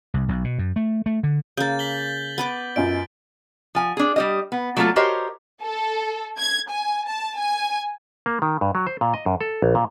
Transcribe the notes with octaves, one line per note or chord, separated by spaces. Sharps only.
C2
B1
B2
F#2
A3
A3
D3
C#3 A#3 G6 A6
B6 F#7 G7
B3 B4 D6
F#2 F4 D#5 D7
F3 G#5
D4 G#4
G3 G4 D#5
B3
F#3 A3 A#3 E4 F4 A4
F#4 G4 A#4 C5 C#5 D#5
A4
G#6
G#5
A5
G#5
A#3
D#3
G2
F#3
C5
A#2
D#5
F#2
A4
A#1
A#2